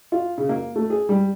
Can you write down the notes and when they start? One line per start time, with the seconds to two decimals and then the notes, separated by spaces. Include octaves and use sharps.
0.12 F4
0.38 C#3
0.49 A#3
0.76 A3
0.90 G#4
1.09 G3